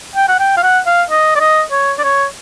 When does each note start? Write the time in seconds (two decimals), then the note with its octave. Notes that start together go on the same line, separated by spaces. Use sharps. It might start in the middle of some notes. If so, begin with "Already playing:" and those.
0.16 G5
0.28 F#5
0.39 G5
0.57 F5
0.63 F#5
0.86 F5
1.10 D#5
1.35 D5
1.40 D#5
1.71 C#5
1.98 D5
2.04 C#5